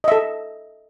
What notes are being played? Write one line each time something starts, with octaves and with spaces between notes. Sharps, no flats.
A4 D#5 E5